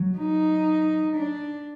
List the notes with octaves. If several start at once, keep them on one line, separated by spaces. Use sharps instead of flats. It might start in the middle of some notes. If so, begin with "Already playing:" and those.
Already playing: F#3
D#4
D4